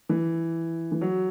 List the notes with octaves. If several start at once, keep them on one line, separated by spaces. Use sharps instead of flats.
E3
E3
F#3